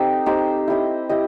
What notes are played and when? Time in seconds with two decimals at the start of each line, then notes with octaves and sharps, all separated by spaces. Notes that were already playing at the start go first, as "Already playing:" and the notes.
Already playing: C4 D#4 G4 A4 C5
0.26 C4 D#4 G4 C5
0.68 E4 G4 D#5
1.09 E4 G4 D#5